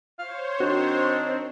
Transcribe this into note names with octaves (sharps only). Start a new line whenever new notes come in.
C5 C#5 F5
D#3 C4 D4 F#4